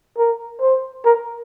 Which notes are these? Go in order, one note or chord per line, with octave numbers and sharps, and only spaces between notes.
A#4
C5
A#4